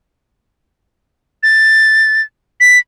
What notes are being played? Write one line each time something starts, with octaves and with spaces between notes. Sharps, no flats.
A6
B6